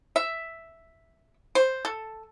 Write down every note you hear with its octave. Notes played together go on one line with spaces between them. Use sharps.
E5
C5
A4